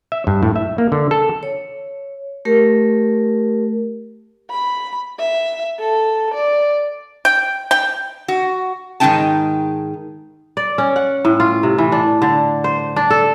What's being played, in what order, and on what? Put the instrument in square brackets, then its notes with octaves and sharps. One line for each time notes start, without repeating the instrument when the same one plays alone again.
[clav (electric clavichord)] E5
G2
A2
E5
A#3
D3
A4
[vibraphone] C#5
A3 G4 A#4
[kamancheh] B5
E5
A4
D5
[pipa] G5
G5
[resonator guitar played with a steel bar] F#4
G#2 D#3 G#3 D#4 G5 A5
[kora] D5
C#4
F#5
A2
F4
C3
E3
D4
D3
C5
D4
A4